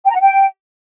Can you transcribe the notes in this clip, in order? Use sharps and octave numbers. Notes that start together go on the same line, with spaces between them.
G5
A#5
F#5
G5